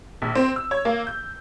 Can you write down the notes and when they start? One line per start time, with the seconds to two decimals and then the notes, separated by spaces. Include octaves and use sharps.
0.22 A#1
0.35 C4
0.56 E6
0.71 C#5
0.85 A#3
1.07 G6